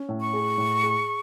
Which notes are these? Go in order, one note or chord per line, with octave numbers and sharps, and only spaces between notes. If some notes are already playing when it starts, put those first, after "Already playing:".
Already playing: C#4
A2
C#6
G#4
A2
G#4